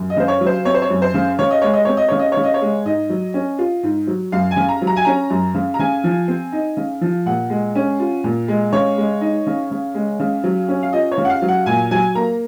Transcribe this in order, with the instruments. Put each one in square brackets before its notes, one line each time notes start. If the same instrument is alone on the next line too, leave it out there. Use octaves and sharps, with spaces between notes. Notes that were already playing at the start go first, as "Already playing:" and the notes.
Already playing: [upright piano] F#2
D#5
C#3 C5
C#5
F#3
C5
C4 C#5
C5
C#5
F#2
C5
C#3
C#3 C#5
D#5
G#3 C#5
D#5
C4 C#5
D#5
C#3 C#5
D#5
C#3 C#5
D#5
C#5
G#3
G#2 D#5
F#3
C#4
F4
G#2
F#3
F#2 F5
G#5
C#3
A#5
F#3
A#5
G#5
C#4 A#5
F#2
C#3
A#5
C#3 G#5
F3
C4
D#4
C#3
F3
A#2 F#5
G#3
C#4
F4
A#2
G#3
C#3 C#5
G#3
D#4
C#3
C#3
G#3
C#3
F#3
C#4
F5
F4 D#5
C#5
C#3
F#5
F5
F#3
F#5
A#2 G#5
F#3 G#5
A#3 A#5